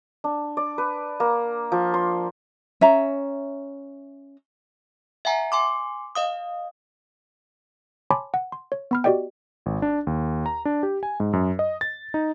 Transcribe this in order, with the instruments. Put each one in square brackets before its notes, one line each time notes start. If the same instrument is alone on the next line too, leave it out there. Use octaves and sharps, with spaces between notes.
[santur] D4
D5
B4
A#3
F3
C6
[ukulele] C#4 E5 A#5
[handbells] E5 F#5 G#5 A#5
G#5 C6 D6
D#5 F5 D#6
C#5 G#5 A5 B5 C6 D6
F#5
C6
C#5
B3 B5 F6
F#4 G4 D5 D#5 G5
[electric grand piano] G#1
D4
D#2
A#5
D4
G4
G#5
G#2
F#2
D#5
A6
D#4